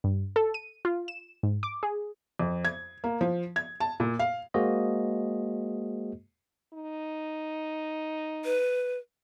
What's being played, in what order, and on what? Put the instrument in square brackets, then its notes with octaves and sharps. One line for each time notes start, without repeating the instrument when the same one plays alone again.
[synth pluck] G2
A4
D#7
F4
E7
G#2
D6
G#4
[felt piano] F2
G#6
A#3
F3
G#6
A5
A#2
F5
[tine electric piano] G#3 A#3 F#4 G#4 C5 D#5
[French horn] D#4
[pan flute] B4